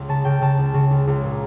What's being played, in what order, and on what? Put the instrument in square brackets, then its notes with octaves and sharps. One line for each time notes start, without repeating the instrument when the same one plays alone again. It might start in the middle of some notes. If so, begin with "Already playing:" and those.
Already playing: [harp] C#2
C#3 A5
C#3 G5
C#3 A5
C#2
C#3
C#2
C#2
A#2